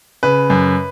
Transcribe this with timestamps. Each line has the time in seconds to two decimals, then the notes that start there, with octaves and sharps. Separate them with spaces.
0.23 C#3 B4
0.50 F#2